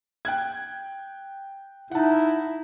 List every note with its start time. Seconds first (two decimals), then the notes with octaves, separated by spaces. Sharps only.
0.25 G5 F#6 G#6
1.91 D#4 E4 F#5 A5